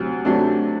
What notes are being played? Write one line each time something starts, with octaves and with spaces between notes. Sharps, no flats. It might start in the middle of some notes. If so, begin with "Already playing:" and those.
Already playing: D2 C3 F#3
C3 F#3 A3 D4